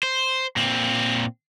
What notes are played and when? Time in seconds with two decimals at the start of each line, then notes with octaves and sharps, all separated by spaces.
0.03 C5
0.56 A#2 C4